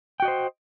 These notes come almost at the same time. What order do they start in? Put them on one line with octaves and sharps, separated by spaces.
G5 F#4 D#5 C5